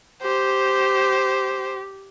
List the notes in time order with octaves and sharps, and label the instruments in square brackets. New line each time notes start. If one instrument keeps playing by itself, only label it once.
[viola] G4 [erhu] C5